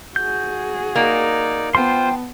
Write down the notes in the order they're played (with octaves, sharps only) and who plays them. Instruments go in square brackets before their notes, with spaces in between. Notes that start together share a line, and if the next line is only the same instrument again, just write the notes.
[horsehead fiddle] F#4 G#4 [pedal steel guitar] G6
[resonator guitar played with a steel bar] A#3 [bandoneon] D#4 D5
[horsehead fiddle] B3 A5 [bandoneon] F4 C5 [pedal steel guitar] G5 C6